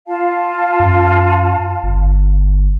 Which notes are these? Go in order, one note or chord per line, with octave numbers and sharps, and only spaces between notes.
F4 F5 A5
F#2
G1